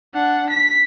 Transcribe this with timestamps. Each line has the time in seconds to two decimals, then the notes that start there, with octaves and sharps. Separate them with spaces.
0.14 D4 F#5
0.50 B6